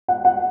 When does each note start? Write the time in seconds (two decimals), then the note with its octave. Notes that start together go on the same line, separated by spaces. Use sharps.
0.08 F#5
0.25 F#5